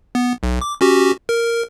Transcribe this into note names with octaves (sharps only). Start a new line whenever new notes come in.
B3
B1
D6
C#4 F#4 G4
A#4